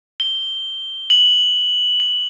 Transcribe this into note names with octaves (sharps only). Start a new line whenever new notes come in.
G7
F#7
F#7